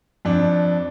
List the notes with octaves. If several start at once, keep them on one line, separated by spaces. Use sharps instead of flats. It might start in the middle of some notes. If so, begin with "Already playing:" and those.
F2 D4